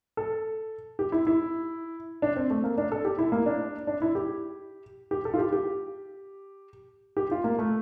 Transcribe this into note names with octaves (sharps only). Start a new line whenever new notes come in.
A4
G4
E4
E4
D4
C4
A3
A#3
D4
A4
G4
E4
A#3
D4
D4
E4
G4
G4
A4
F4
G4
G4
G4
F4
A#3
A3